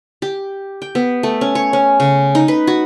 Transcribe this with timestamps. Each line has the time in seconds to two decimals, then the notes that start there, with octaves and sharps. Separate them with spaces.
0.22 G4
0.82 G5
0.95 B3
1.23 A3
1.41 C#4
1.55 C#5
1.73 C#4
2.00 C#3
2.35 D#4
2.48 B4
2.67 F#4